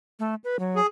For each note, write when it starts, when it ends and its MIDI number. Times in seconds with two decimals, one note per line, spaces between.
0.19 0.35 57
0.44 0.59 71
0.59 0.80 54
0.76 0.87 68